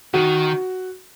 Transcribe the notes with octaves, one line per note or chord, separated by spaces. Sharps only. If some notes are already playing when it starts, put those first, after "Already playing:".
D#3 F#4